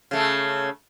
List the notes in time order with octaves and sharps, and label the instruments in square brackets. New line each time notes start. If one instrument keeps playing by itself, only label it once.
[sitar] C#3 A3